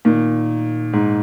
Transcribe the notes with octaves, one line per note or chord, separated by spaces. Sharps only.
A#2 D#3
G#2